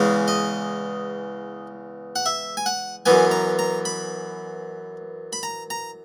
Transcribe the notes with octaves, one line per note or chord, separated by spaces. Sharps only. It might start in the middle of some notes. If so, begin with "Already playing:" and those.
Already playing: E2 C#3 G#3
D#5
F#5
E5
G#5
F#5
F#2 E3 B3 G#5
A#5
A#5
B5
B5
A#5
A#5